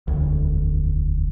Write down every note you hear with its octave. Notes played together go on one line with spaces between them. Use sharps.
E1 D2